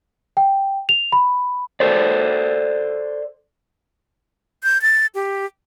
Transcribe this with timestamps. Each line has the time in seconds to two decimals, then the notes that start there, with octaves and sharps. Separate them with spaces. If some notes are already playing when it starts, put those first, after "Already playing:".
0.37 G5
0.89 F7
1.12 B5
1.80 A4 C5 D5
4.63 G6
4.82 A6
5.15 G4